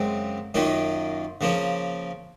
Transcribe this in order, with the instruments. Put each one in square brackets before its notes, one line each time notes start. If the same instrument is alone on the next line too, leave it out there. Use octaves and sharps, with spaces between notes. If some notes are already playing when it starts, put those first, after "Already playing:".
Already playing: [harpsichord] F#2 C#3 G#3 C4
F#2 D#3 A#3 C#4 F4
C#3 F3 A#3 C#4